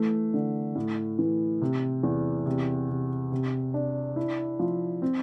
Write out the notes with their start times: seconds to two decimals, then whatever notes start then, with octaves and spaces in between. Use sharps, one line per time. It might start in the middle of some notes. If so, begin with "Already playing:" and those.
Already playing: E3 A3
0.34 D3
0.75 A2
1.19 E3
1.61 C3
2.03 E2
2.46 C3
2.89 C3
3.32 C3
3.74 D4
4.16 E4
4.59 F3
5.02 C4